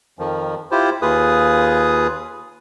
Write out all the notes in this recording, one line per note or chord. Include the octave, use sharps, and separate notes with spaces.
F2 D#3 F3
E4 F4 G4 C5
D#2 F4 G#4 B4 D#6